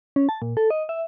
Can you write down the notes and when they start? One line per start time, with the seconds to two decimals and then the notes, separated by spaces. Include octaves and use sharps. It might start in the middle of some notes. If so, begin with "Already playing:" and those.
0.16 C#4
0.29 A5
0.42 A#2
0.57 A4
0.70 D#5
0.89 E5